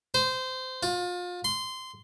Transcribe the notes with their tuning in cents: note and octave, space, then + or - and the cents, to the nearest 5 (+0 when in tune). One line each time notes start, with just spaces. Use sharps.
C5 -20
F4 +30
C6 -15